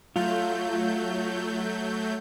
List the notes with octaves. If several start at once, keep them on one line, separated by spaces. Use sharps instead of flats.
F#3 A3 F4 G6